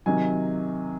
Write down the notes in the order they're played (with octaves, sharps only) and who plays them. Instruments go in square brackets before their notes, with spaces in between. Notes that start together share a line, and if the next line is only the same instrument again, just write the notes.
[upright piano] C3 D#3 F#3 G#5